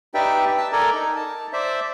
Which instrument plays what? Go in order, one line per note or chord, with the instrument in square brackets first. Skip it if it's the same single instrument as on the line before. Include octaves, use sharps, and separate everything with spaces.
[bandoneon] D#4 G4 B4 D5 E5 G5
A5 E6
A4 A#4 D5 G#5 A#5
D#4
A5
C5 D5 E5